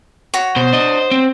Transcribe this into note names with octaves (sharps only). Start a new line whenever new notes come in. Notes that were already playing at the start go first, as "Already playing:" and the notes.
F#4 C#5
B2 C5
D4 D#5
C4